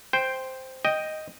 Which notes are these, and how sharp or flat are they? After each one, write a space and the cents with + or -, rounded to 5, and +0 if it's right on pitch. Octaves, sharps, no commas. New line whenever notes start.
C5 +0 G5 +5
D#5 +0 G5 +0